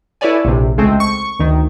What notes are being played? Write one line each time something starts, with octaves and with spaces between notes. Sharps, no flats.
E4 A4 B4 C#5 D5 G#5
A#1 C3
C#2 G#3 A3 C4
C#6
D2 D#3